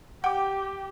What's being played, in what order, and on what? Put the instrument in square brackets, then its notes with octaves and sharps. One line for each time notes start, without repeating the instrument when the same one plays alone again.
[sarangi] G4 [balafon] F#5 [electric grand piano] G5 D6